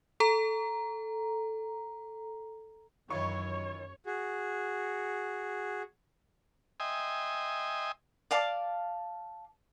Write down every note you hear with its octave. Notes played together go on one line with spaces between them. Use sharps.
A4 A#5
F#2 D#3 E3 F4 C#5 C#6
F#4 G#4
D#5 E5 G5 G#5 C6 D#6
D5 F5 A5 D6